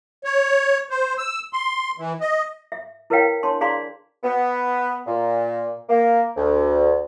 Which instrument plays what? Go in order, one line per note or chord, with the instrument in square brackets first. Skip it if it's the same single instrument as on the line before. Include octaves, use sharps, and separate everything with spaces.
[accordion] C#5
C5
E6
C6
E3
D#5
[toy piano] E5
E4 A#4 B4 C#5 F5 G5
D4 C#5 A5 C6
D4 G#4 D5 F5 A#5 C6
[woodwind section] B3
A#2
A#3
D2